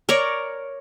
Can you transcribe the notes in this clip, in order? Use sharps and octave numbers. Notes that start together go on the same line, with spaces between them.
A#4 C#5 D5